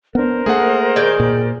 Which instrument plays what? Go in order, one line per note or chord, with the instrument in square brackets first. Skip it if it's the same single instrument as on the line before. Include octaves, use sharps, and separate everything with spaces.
[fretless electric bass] B3 D4 [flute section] A#4 C5
[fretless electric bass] A3 A#3 [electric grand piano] G#4 F#5
[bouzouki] D#3 G#4 G5 [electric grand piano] D5
[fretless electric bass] A#2